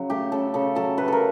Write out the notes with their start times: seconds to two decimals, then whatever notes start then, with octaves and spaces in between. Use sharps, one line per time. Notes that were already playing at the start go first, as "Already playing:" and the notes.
Already playing: C#3 F#3
0.10 A3 G4
0.32 C#3 A4
0.54 C#3 A4
0.75 F#3 A4
0.98 A3 B4
1.08 A4 A#4